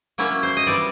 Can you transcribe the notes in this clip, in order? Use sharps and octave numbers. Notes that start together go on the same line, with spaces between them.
F#3 A#3 C#4 E4
C5
D#5
E3 G3 C4 D5